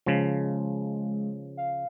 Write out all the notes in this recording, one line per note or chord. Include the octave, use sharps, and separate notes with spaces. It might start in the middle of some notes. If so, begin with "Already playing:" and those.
C#3 F3 G#3
F5